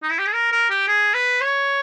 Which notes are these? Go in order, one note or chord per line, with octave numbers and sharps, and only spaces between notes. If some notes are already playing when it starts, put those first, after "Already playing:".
D#4
E4
G4
G#4
A#4
A#4
G4
G#4
B4
C#5